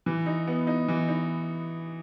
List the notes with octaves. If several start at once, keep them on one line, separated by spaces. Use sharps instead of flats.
E3
D#4
B3
D#4
E3
D#4